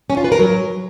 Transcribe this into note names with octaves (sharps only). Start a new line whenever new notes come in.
C#4
F4
B4
A#4
F#3